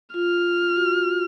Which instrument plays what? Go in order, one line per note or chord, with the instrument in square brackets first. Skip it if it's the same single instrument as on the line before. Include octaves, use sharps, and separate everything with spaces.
[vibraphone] F4 [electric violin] F6
[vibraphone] F#4